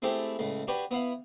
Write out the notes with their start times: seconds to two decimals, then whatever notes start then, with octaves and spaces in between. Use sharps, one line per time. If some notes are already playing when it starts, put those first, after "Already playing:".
0.02 G#3 A3 C4 E4 G4 A4
0.39 C#2 A2
0.67 D4 F#4 G4 B4 C#5
0.91 B3 E4 F5 F#5